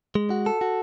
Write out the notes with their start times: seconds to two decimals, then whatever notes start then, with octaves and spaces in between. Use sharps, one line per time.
0.15 G#3
0.30 F#4
0.46 A4
0.61 F#4